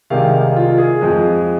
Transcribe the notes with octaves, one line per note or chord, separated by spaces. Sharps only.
C2 C3 D#3 G#3 F5
F5
F4
G#4
F2 F3 G#3